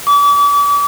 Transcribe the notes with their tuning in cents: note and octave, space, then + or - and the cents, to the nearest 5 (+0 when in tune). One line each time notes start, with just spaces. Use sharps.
D6 -40